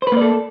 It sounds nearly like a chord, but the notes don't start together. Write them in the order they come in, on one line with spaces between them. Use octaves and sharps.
C5 B4 A#3 D5 A4